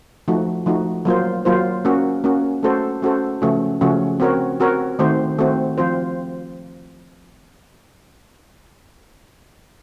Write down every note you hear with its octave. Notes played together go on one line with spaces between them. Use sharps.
F3 A3 D#4 F#4
F3 A3 D#4 F#4
F#3 A#3 F4 C5
F#3 A#3 F4 C5
A#3 C#4 F#4
A#3 C#4 F#4
A3 C#4 F#4 A4 C5
A3 C#4 F#4 A4 C5
C#3 F3 A3 C#4 F#4
C#3 F3 A3 C#4 F#4
C4 F#4 A#4 C#5
C4 F#4 A#4 C#5
D#3 A3 C4 F#4 C5
D#3 A3 C4 F#4 C5
F3 C4 F4 C5